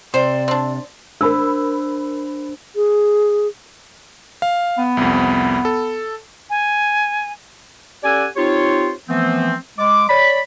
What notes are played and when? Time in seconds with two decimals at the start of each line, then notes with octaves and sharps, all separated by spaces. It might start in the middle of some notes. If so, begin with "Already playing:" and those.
0.14 C3 C5 D5
0.48 C4 D4
1.21 D4 A#4 C5 B5 E6
2.76 G#4
4.42 F5
4.78 B3
4.97 C2 F2
5.65 A4
6.50 G#5
8.04 C#4 G4 A4 D5 F#5 G#5
8.36 C4 D#4 F4 G4 C5 C#5
9.09 E3 F3 A3 B3 C4
9.78 G#3 D6
10.09 C#5 D5 B5